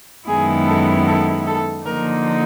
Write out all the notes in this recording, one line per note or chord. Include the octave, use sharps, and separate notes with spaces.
F#2 D#3 G#3 B3 E4 G#4
A4
A4
A4
D3 F3 A#3 D#4 A#4